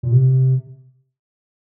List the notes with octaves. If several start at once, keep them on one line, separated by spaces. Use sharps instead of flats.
A#2
C3